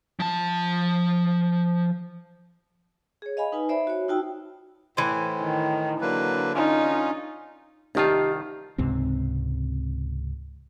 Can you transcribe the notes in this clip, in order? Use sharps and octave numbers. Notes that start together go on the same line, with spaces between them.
F3 A5
G#4 C#5
D#5 F5 G#5 B5
D#4 B4 G#5 A5
C5 D5 E5 B5
F#4 C#5
D#4 F4 F#4 G5 A5 E6
A2 E3 C5
D#3
D3 F#3 A#3 B4
C#4 D#4 F4
C2 D#3 D#4 F4 G4 A5
C#2 G#2 C3 C4